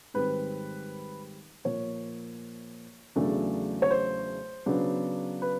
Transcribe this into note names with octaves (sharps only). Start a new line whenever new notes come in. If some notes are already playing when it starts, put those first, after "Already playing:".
G#2 D#3 G3 C4 B4
A#2 F3 A#3 C#5
E2 C#3 F#3 A3 D4
C#5
C5
C#3 F#3 B3 D4
B4